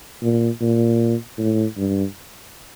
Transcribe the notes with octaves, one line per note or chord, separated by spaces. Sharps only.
A#2
A#2
A2
G2